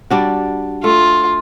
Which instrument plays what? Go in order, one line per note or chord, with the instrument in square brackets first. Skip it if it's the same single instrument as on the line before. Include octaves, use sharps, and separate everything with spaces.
[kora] G3 D4 F#4
[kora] A3 [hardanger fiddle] F4